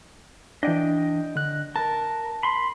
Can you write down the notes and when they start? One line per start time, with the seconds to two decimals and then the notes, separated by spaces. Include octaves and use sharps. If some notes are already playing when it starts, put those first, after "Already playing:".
0.63 E3 D4 D#5 G5
1.36 D3 F#6
1.76 A#4 A5
2.43 B5 C6